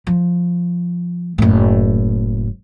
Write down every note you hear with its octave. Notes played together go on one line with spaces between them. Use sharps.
F3
F#1 A2